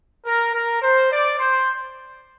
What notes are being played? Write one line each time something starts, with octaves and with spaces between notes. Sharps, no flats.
A#4
A#4
C5
D5
C5